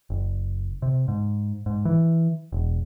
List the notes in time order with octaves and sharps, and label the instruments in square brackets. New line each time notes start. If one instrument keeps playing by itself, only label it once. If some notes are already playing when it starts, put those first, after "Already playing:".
[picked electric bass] F#1
C3
G#2
G#2
E3
E1